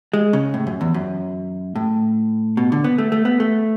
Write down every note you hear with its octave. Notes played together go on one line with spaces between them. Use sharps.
G#3
C#3
A2
F#2
E2
F#2
A2
B2
D3
B3
A3
A3
B3
A3